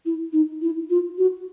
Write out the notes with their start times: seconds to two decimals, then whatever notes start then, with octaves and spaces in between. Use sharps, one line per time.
0.05 E4
0.32 D#4
0.61 E4
0.90 F4
1.18 F#4